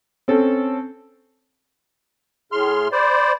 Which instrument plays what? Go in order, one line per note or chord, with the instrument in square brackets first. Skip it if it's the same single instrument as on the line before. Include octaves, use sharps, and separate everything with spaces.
[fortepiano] C4 C#4 A4
[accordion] A2 C6 F6 [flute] G#4
[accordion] C5 D5 [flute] B5